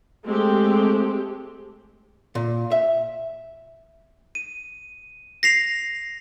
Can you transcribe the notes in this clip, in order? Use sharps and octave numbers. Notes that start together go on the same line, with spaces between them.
G#3 A3 C4 G4
A#2
E5
D#7
A#6 C7 F7